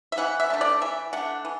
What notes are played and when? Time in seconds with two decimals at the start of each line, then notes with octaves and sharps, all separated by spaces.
0.12 E5
0.18 E3 F#5
0.40 E5
0.50 A3 D4
0.61 D5
0.81 E3 E5
1.13 A3 D4 F#5
1.45 E3